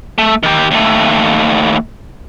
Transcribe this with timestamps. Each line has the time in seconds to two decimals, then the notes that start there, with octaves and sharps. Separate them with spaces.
0.18 A3
0.43 D#3 G4
0.71 D#2 A3